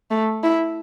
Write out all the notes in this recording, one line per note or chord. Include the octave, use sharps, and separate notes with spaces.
A3
E4